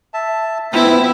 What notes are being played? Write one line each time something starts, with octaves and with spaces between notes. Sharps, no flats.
E5 A5
B3 C4 E4